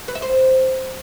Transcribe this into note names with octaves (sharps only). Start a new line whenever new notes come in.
B4
E5
C5